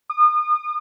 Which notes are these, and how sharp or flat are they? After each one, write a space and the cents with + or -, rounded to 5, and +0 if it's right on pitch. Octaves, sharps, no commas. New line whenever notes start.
D#6 -35